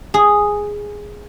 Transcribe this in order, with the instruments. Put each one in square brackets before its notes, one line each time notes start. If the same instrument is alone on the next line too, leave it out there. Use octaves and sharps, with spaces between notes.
[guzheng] G#4